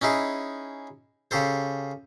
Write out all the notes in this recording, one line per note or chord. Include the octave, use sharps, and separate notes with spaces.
C#4 D#4 E4 G#4
C#3 G4 A4 C5